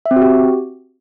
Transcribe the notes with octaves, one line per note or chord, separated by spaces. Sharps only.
E5
C4
F#4
G4